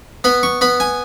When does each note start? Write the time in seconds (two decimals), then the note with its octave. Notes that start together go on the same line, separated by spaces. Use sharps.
0.24 B3 B5
0.43 C#6
0.61 B3 B5
0.80 G#5